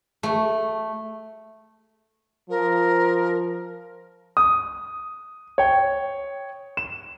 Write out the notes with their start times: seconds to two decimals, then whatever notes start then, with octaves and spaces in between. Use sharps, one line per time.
0.23 A3
2.50 F3 A#4
4.37 D#6
5.58 C#5 G5
6.77 E7